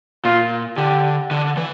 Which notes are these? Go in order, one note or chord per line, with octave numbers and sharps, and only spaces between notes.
A#2 F4
D3 G4
D3
E3